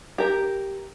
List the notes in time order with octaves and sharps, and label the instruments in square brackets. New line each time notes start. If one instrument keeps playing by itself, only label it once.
[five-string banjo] G4 A#4